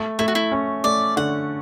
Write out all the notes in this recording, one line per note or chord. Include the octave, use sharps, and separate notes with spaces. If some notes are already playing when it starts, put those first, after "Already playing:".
Already playing: A3
A3 E4
F#4
E4
C#4
A3 D5
D3 F#5